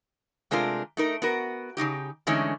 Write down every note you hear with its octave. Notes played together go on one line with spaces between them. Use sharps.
C3 G#3 A3 D4 F4 A#4
A3 D#4 A#4
B3 F#4 A#4
C#3 E3 D#4 G4
D3 E3 G#3 A3 C#4 D#4